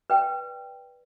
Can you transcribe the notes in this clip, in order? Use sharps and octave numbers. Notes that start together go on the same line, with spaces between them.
B4 D5 G5